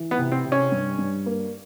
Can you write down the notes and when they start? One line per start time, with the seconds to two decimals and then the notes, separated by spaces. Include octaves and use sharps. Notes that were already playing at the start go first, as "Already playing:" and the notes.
Already playing: E3
0.11 B3
0.18 C3
0.32 C4
0.45 C3
0.52 C#4
0.72 G2
0.99 G2
1.26 A#3